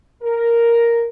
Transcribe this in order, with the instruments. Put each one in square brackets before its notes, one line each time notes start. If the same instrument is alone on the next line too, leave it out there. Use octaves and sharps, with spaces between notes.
[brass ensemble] A#4